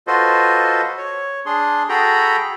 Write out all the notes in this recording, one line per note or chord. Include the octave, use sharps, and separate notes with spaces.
F4 F#4 A4 B4 C5 D#5
C#5
D4 G#4 C6
F#4 G#4 A4 G5 A#5 B5